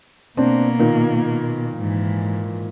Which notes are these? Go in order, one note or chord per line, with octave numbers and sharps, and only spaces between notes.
B2 A#3 C4 D4
A#2 D#3
G#2 E3